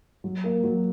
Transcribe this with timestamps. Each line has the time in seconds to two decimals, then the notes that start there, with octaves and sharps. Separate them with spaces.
0.24 F#3
0.44 A#3
0.64 F#3